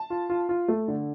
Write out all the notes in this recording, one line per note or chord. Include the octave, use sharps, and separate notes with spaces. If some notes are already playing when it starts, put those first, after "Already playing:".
Already playing: A5
F4
F4
F4
A3
D3